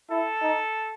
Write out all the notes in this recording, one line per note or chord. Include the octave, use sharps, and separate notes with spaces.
E4 A4
D#4